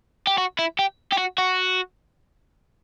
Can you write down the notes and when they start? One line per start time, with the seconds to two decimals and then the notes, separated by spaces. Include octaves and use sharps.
0.27 G4
0.38 F#4
0.59 E4
0.79 G4
1.12 G4
1.18 F#4
1.38 F#4